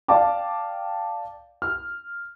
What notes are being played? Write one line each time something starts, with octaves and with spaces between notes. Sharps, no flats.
D5 F5 G5 A5 D6
F6